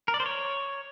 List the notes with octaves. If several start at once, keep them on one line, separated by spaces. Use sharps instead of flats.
A#4
D5
C5
C#5